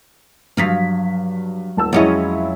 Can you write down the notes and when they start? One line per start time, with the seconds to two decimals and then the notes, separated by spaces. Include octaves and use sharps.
0.57 G2 F3 F#3 F5 B6
1.77 D#1 A5 E6
1.93 F2 F#3 G#3 C#4 E4 D#5